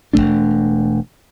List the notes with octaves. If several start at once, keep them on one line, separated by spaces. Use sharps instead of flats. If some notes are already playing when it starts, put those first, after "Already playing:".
E1 G2 A3 D4